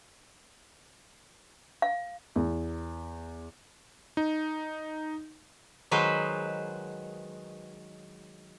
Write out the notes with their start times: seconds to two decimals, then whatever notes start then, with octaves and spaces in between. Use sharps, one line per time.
1.82 F5
2.36 E2
4.17 D#4
5.91 D#3 F#3 G#3 B4 C5